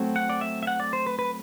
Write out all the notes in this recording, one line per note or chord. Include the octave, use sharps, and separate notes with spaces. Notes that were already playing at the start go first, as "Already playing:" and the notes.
Already playing: F#3 A3 C4
F#5
D5
E5
E5
F#5
D5
C5
B4
B4